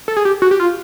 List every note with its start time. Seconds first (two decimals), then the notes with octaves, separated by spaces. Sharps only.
0.08 A4
0.17 G#4
0.25 G4
0.42 F#4
0.51 G4
0.60 F4